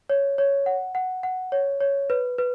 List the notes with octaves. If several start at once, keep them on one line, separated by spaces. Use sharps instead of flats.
C#5
C#5
F#5
F#5
F#5
C#5
C#5
B4
B4